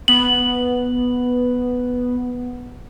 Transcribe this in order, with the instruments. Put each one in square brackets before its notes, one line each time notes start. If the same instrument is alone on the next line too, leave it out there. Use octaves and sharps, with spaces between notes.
[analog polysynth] B3 [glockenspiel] F#7